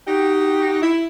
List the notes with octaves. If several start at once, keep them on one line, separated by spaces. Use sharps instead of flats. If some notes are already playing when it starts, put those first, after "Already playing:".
D#4 F#4 G4
E4